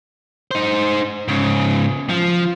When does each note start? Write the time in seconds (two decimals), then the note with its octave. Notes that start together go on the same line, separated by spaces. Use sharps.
0.51 D#4 C5
1.28 G#2 C#3
2.09 F3